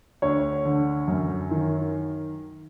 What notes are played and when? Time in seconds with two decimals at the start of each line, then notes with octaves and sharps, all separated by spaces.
0.22 D2 C#5
0.65 D3
1.08 F#2
1.51 D#3